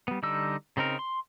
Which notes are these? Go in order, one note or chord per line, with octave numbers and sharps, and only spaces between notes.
G3 B3
D3 G3 D#4 E6
C#3 C4 D#4 A#4
C6